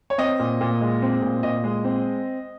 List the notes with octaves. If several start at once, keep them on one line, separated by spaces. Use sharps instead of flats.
C#5
C4 D#5
A#2
A#2
G#3
C4
A#2
A#2 D#5
G#3
C4